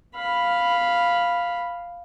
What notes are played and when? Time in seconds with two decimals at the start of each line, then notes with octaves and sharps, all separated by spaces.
0.15 F5 B5